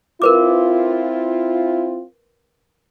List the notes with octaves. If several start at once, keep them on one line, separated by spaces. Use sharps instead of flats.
C4 E4 F4 A#4 B4 D6